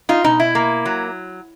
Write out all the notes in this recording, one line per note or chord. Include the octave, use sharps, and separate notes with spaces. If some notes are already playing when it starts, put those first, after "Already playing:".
D#4 F4
B2 D#4
E4
A#3
F#3